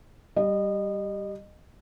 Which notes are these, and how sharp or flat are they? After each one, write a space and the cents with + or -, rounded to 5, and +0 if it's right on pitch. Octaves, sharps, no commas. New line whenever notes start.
G3 +0 D#5 -25